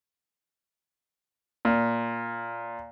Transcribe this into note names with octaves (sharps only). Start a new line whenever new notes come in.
A#2